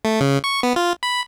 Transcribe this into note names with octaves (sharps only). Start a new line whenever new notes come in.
A3
C#3
C#6
B3
F4
B5